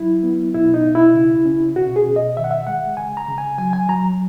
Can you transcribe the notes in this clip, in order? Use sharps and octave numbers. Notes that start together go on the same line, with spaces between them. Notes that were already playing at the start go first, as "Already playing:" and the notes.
Already playing: F#3 E4
B3
B2 E4
D#4
B2
E4
C#3
C#4
B2 F#4
G#4
B2
D#5
D#3 E5
F#5
E5
G#3 F#5
C#3 G#5
A#5
C#3
G#5
F#3 G#5
G#5
F#3 A#5